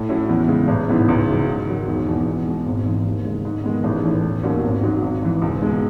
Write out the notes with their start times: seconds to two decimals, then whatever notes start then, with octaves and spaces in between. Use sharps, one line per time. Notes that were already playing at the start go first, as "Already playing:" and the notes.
Already playing: A2
0.09 F#3 C#4 E4
0.29 E2
0.48 C#3 G#3
0.68 A1
0.88 G#2 E3 B3 E4
1.09 C#2
1.28 C#3 F#3
1.47 G#2
1.66 D#3 F#3
1.87 E1
2.07 E2 B2
2.26 E2
2.47 B2 G#3
2.66 G#1
2.85 G#2 E3
3.06 D#2
3.25 C#3 G#3
3.45 G#2
3.64 D#3 G#3 B3
3.84 A1
4.03 A2 E3
4.23 E1
4.43 D#2 D#3 F#3 C#4
4.63 G#1
4.83 G#2 F#3
5.02 G#1
5.22 G#2 E3
5.42 C#2
5.61 B2 G#3